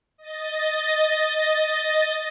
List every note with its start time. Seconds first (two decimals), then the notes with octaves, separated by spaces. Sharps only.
0.18 D#5 A6